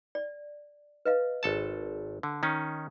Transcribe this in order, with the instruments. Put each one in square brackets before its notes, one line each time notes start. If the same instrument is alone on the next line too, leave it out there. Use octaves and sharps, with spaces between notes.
[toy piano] D5
B4 D#5 F5
[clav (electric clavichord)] G#1 A4 A5
D3
D#3 C#4 D#4